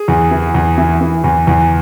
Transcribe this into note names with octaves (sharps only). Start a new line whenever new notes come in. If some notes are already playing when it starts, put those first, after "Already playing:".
Already playing: G#4
E2
E3
E2
E3
E3
E2
E2